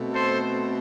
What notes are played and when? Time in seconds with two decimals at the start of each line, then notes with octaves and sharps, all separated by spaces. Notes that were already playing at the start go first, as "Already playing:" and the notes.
Already playing: B2 A3 C4
0.13 A4 C5